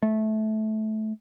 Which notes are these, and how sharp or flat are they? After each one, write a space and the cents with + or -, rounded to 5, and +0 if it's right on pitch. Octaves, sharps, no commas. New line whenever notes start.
A3 -20